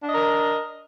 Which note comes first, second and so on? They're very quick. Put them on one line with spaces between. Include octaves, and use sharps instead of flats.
D4 D#5 A#4